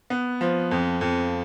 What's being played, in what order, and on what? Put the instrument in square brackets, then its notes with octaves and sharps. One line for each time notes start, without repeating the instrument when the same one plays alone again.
[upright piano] B3
F3
F2
F2